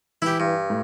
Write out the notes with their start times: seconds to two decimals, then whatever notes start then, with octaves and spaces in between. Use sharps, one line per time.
0.22 E3 E4 G4
0.40 G2
0.70 A2